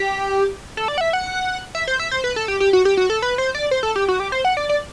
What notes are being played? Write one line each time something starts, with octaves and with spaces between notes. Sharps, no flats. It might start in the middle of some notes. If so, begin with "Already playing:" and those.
Already playing: G4
A4
D5
F#5
E5
F#5
E5
C5
E5
C5
B4
A4
G4
G4
F#4
G4
F#4
A4
B4
C5
D5
C5
A4
G4
F#4
G4
C5
F#5
D5
D5